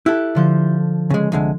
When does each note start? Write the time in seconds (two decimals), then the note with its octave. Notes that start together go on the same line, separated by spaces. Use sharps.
0.06 E4 G4 A4 F#6
0.35 D3 F3 G6
1.10 C#3 G#3
1.32 C2 D3 G#3